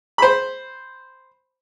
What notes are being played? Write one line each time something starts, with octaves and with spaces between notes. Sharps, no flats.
C5 B5